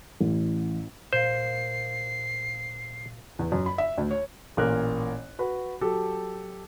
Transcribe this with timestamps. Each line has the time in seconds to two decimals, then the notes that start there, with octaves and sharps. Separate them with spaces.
0.20 A1
1.13 A#2 C5 F5 C7
3.39 E2
3.52 F#2
3.66 B5
3.78 E5
3.98 D2
4.11 C#5
4.57 A1 A#2 A#4 F#6
5.39 F#4 B4
5.81 F#3 G4 A4